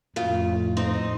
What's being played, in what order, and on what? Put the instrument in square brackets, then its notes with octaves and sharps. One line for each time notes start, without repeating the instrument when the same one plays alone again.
[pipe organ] F2 A2 [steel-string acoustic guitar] C#3 F4
[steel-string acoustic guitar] C4 D#4 D#5